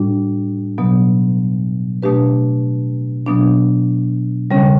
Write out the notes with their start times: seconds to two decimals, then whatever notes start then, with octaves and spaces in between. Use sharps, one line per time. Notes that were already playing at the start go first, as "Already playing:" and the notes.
Already playing: A2 G3 D4 F#4
0.78 B2 F#3 B3
2.03 B2 A3 D4 G4 B4
3.26 B2 F#3 B3 D4
4.51 C#3 G3 C#4